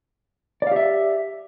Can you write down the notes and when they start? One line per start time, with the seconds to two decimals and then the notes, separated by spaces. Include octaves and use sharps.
0.62 D5
0.67 F5
0.72 G4
0.76 E5